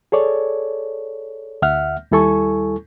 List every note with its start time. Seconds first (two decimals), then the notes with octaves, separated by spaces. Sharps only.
0.12 G#4 A4 C#5 D5
1.62 D2 E5 F#5 F6
2.11 D#2 G3 E4 A4 G#5 C#6